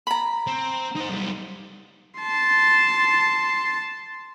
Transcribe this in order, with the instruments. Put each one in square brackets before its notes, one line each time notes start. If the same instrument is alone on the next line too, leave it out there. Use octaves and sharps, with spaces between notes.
[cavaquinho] A#5 B5
[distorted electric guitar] C4
D#4 C5
B1 G3
[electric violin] A5 C6